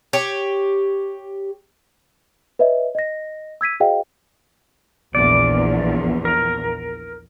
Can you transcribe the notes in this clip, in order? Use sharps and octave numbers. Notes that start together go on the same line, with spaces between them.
G4 C#5
B4 C#5 D#5 E5
D#5 A#6
E6 G#6 B6 D#7
F#4 G#4 C5 D#5 F5 G5
A#1 E2 D5
A#4